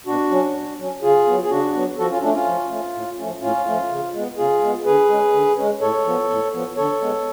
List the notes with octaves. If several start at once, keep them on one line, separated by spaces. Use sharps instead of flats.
B2 D4 F#4
F#3 C#4
B2
F#3 C#4
C#3 F4 G#4
F#3 B3
G#4
C#3 D4 F#4
F#3 B3
F3 F#4 A4
C#4 F4
A3 C#4 D4
C#4 F4
F3
A3 C#4
A2
F3 A3 C#4
A2 C#4 F4
F3 A3 C#4
C#3
G#3 B3
C#3 F4 G#4
G#3 B3
D3 G#4 B4
G#3 C#4
D3
G#3 C#4
A2 A4 C#5
F3 B3
A2
F3 B3
D3 A4 C#5
G#3 B3